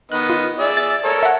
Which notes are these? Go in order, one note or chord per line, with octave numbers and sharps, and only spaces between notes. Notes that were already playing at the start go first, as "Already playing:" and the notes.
D#3 B3 D#5 F#6
F4
G#4 D5 E5
A6
A4 A#4 C#5
E5 F#5